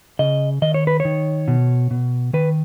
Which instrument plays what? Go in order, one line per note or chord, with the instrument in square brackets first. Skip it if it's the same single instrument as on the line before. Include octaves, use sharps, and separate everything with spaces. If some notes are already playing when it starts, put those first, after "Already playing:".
[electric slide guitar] C#3 D#5
D#3 D#5
C#5
B4
C#5
D#3
B2
B2
D#3 B4